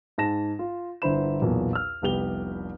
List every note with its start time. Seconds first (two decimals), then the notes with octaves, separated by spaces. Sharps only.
0.18 G#2 A5 A#6 E7
0.59 F4
1.02 G1 D3 E4 C5 B5 E7
1.42 B1 E2 A#2
1.73 E6 F6
2.02 F1 C2 B3 G4 F7 G7